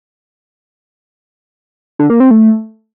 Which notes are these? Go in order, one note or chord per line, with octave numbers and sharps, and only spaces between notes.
D3
A#3
C4
A3